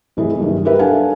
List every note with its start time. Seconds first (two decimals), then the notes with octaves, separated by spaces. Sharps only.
0.17 F1 E3 G#4
0.38 F#1 G2 D#3
0.65 G4 A#4 B4 E5
0.79 D4 A4 A#4 F5 F#5 G#5